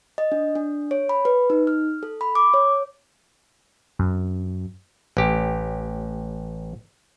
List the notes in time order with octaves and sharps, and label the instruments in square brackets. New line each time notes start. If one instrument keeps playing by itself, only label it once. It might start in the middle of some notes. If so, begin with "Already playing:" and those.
[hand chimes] D#5
D4
D4
C#5
B5
B4
D#4
F6
A4
B5
D6
C#5
[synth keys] F#2
[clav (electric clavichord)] A1 G4